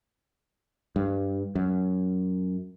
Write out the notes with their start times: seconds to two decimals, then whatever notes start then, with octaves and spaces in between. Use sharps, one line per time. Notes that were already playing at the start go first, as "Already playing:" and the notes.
0.96 G2
1.55 F#2